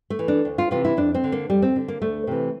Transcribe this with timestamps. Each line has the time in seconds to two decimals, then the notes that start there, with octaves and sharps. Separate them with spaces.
0.10 A3
0.19 E3
0.28 D4
0.45 D2
0.58 F4
0.71 C3 E3 F4
0.85 E4
0.97 F2 D4
1.14 C4
1.24 D3
1.32 A#3
1.49 F2 G3
1.62 C4
1.76 D3
1.88 A#3
2.01 D2 A3
2.27 C3 E3